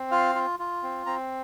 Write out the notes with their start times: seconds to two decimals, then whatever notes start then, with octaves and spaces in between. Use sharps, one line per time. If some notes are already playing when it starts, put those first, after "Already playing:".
Already playing: C4
0.11 F4 F5
0.35 F4
0.60 F4
0.83 C4
1.06 C4 A#5